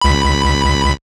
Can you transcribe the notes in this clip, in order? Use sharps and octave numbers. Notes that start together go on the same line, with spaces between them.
C#2 B5